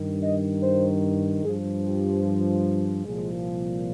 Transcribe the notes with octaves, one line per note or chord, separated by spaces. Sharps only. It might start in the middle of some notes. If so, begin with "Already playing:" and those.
Already playing: G2 D#3
D#5
C5
G2 F3 G#4
G4
C2 A#2 F3 G#3